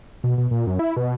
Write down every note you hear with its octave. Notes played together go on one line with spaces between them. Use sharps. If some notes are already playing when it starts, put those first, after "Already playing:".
B2
B2
A#2
F#2
E4
B2